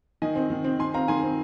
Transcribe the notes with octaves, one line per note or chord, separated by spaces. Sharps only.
D#3 D#5 G#5
C4
D#3
C4
D#3 G#5 C6
C4 F5 A#5
D#3 G#5 C6
C4